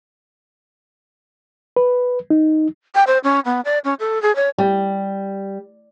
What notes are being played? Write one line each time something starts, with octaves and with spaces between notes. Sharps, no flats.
B4
D#4
G5
C5
C#4
B3
D5
C#4
A4
G#4
C#5
G3